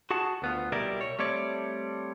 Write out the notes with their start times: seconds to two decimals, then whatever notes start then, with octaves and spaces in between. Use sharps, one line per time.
0.11 F#4 G#4 F#5 A5
0.42 D2 B3 F4
0.72 C2 B2 G3 E4 A#4 D5
1.01 C#5
1.19 G3 A3 C4 C#5 D5